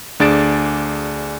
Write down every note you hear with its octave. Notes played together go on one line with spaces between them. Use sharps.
D2 D4 G#4 A6 D7 E7